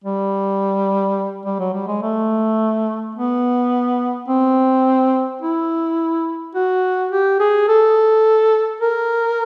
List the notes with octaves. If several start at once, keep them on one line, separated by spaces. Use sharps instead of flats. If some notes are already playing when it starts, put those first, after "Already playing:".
G3
G3
F#3
G3
G#3
A3
B3
C4
E4
F#4
G4
G#4
A4
A#4